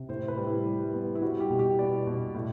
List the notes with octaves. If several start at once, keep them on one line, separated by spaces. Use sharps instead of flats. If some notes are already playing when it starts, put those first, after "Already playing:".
Already playing: C3
A2 C5
B4
G3
E4
G3
B3
E4
G3 F#4
G4
B2
G4
B3 D5
B2
A2